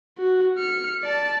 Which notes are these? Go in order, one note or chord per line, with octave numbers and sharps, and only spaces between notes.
F#4
F6 C#7
D5 A5